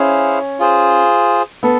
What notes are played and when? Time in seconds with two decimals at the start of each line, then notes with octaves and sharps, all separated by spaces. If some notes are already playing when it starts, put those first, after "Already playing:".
Already playing: C#4 E4 G#4 C5 F5
0.59 F4 G#4 C5
1.63 B3 A4